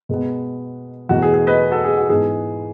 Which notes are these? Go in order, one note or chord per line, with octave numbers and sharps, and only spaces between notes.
B2 G#3 B3
E2 B2 A3 F#4
G#4
G#4
B4 D#5
F#4 A4
G#4
F#4
G#2 E3 G#3 B3 G#4